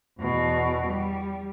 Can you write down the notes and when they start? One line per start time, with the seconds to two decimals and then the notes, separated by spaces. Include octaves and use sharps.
0.19 E2 B2
0.88 G3